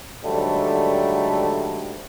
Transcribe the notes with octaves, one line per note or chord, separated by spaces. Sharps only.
G#2 D3 F#3 G3 A3